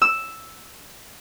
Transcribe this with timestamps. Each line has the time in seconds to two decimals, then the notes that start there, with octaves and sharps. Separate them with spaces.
0.02 E6